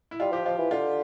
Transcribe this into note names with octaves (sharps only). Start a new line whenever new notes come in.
E4
G3 F4
F3 G4
F3 F4
E3
D3 F4